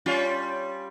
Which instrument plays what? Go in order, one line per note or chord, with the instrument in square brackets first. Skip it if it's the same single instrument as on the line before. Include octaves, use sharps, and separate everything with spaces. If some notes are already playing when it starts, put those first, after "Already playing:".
[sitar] G3 C#4 F4